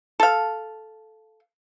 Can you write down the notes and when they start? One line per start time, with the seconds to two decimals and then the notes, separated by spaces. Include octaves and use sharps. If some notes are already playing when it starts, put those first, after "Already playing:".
0.20 A4 F5